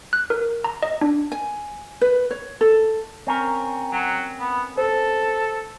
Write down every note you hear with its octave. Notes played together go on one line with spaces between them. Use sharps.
F#6
A#4
A#5
D#5
D4
G#5
B4
C#5
A4
C4 C#4 A#4
F#3
B3
A4 C5